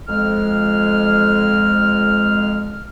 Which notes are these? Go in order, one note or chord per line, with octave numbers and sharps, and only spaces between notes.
F2 G#3 F6